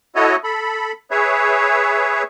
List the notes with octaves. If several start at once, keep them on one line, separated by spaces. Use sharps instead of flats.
E4 F#4 A4 C#5 D#5
A4 B5
G#4 B4 C#5 E5